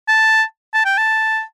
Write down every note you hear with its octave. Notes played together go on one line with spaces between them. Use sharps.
A5
A5
G5
A5